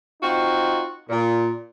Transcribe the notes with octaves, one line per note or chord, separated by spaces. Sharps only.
C4 D#4 F4 F#4
A#2